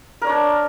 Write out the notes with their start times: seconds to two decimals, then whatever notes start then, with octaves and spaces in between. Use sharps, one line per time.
0.22 A#4
0.24 D5
0.27 C#5
0.29 D4